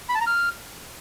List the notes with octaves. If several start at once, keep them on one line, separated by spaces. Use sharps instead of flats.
B5
A5
A#5
F6